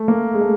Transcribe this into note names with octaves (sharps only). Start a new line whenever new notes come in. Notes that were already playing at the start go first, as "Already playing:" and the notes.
Already playing: A3
A#3
G#3
A3